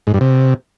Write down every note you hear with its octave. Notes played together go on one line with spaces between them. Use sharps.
G#2
G2
C3